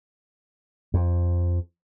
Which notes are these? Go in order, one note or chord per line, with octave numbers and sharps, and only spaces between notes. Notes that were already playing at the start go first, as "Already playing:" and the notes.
F2